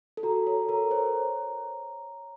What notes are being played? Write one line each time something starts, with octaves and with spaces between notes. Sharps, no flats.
A4
F#4 A#5
A4 C#5
A#4 A#5
C5 C#5